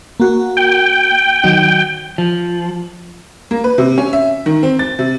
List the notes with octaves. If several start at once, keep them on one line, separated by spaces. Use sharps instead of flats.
A#3 F#4
G5
D#3 F#3 D#4
F3
A#3
B4
C3
C#4
E5
D#3
C4
A6
C3